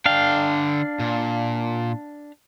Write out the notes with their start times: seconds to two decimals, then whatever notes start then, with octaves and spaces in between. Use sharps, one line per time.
0.06 D3 D4 F5 G5
0.99 A#2